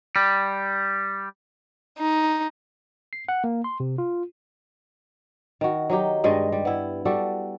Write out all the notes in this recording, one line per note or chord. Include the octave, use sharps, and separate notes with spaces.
G3
D#4
C7
F#5
A#3
C6
C3
F4
D#3 F#4
F#3 D#4 G4
G2 G3 G#3 D#5
G3
B3 E4
G3 D4 F#4 A4